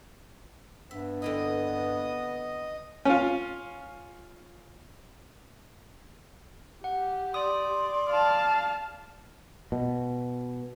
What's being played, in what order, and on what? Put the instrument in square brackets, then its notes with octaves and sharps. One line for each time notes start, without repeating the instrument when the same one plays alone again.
[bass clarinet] G2 [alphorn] B3 [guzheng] E5
[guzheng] D3 C4 E4 [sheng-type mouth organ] D#5 D#6
[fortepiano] C#4 F4
[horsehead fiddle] G4 [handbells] F#5
[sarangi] D5 [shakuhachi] C6 [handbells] D#6
[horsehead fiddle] F5 A5
[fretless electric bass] B2